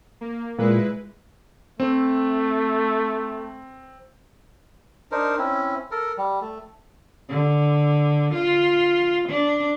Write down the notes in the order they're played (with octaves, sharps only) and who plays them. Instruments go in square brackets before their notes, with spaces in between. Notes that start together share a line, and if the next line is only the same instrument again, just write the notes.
[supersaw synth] A#3
[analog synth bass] A#2 [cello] G#3 [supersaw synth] E4 B4
[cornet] A3 [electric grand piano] C4
[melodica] D4 D#4 A#4 C5
C4 C#4 E4
A4 A#4
G3
A3
[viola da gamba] D3
F4
D4